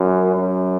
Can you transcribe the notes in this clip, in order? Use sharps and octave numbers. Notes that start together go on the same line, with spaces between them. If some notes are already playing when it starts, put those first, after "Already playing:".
Already playing: F#2
F#2